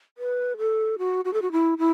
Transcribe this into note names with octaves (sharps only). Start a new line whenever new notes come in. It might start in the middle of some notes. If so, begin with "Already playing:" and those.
B4
A4
F#4
F#4
A4
F#4
E4
E4